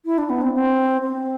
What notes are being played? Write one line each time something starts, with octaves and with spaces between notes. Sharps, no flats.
E4
D4
B3
C4
C4
C4